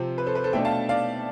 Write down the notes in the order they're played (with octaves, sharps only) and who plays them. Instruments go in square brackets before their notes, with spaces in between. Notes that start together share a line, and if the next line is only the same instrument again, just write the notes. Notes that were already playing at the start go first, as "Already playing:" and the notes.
Already playing: [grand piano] C3 F3 C4
B4
A4 C5
B4
A4 C5
B2 A3 D4 E5 G5
F5 A5
D5 F5